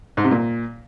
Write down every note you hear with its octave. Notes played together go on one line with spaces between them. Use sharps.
G#2
C3
A#2